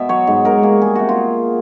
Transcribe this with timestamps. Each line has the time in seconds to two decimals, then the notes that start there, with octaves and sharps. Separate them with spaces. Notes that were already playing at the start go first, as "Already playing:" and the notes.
Already playing: B2 E5
0.09 F#3 C#5
0.27 G#2
0.45 G#2 A#4
0.63 A#3 G#4
0.82 G3 G#4
0.95 C3 F#4
1.09 F4